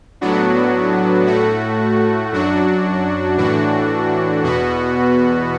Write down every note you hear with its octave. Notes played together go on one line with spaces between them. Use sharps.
A2 F#3 B3 D4 F#4
A2 A3 F#4
F#2 F#3 D4 F#4
A2 E3 D4 F#4
E2 B2 B3 F#4